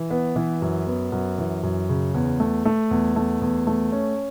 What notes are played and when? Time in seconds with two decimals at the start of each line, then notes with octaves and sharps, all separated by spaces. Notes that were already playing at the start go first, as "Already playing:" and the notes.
Already playing: E3
0.10 B3
0.36 E3
0.62 F#2
0.87 B3
1.12 F#2
1.38 E3
1.63 F#2
1.89 C#3
2.14 E2
2.40 A3
2.65 A3
2.91 E2
3.16 A3
3.41 E2
3.67 A3
3.92 C#4